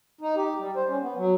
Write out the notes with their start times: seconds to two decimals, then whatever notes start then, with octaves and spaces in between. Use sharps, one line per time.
0.21 D#4
0.36 G4
0.59 G3
0.76 C5
0.89 C#4
1.02 B3
1.17 F#3